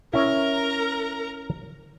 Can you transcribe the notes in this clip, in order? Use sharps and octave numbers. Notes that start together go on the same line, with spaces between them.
C#4 E4 A#4 A#5